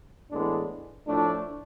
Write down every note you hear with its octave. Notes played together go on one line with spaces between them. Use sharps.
A2 E3 G#3 B3 D4
A2 F3 A3 D4